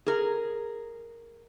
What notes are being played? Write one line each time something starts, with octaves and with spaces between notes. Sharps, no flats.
G#4 A#4